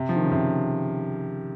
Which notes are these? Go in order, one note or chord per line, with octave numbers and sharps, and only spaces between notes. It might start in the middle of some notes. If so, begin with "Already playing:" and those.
Already playing: C3
F3
D#3
C#3
C3